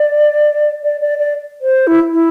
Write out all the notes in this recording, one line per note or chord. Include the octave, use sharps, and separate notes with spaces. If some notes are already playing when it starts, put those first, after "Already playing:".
Already playing: D5
D5
D5
D5
C5
E4
E4